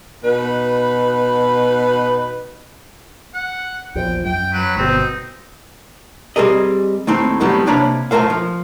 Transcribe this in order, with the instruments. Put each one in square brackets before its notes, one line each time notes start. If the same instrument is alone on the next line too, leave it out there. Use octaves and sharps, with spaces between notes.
[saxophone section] B2 D#4 B4
[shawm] F#5
[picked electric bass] A#1 E2 F3 [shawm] G5
[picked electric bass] F#2 [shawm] G5
[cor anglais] F#3 [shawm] B4
[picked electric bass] G1 B2 [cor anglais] C4 [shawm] D#4
[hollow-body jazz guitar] G3 C4 G#4 A#4 D#5
D#2 A2 C4 D#4
A2 F#3 G3 B3 C4
C3 A#3 D4 C#5 A#5 B5
F#2 A3 A#4 C5 F5
F3